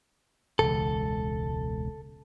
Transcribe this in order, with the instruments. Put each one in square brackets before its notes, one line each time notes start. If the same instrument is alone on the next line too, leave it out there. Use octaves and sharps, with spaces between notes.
[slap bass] E1 C#2 [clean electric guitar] A4